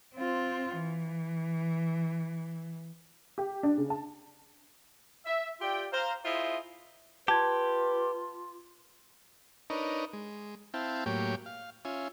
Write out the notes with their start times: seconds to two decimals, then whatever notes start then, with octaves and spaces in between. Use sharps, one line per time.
0.15 C4 F4
0.75 E3
3.38 G4
3.63 D4
3.78 C#3
3.90 A5
5.26 E5
5.60 F4 G4 D5 E5 G5
5.92 C5 F5 A#5
6.24 E4 F4 G#4 C5 D#5 E5
7.28 F4 G4 B4 A5 G#6
9.70 D4 D#4 A#4 B4 C#5 D#5
10.13 G#3
10.74 C4 E4 F5 G5 A5
11.06 A2 F#3 A#3 G4 C#5 G5
11.46 F5
11.85 C#4 F4 E5 G#5